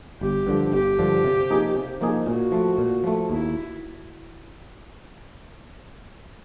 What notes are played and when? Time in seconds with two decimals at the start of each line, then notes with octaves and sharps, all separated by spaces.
0.21 G1 G4
0.47 G2 D3 F3
0.72 G1 G4
0.99 G2 D3 F3
1.24 C3
1.50 F3 A#3 D#4 G#4
1.75 C3
2.01 F3 A#3 D#4 G#4
2.26 A#2 F#4
2.52 F3 A3
2.78 A#2
3.04 F3 A3
3.29 D#2 E4